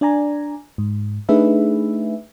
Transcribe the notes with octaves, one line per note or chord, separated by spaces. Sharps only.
D4 D5 G#5 A#5
G#2
A3 D4 D#4 G#4 B4 E5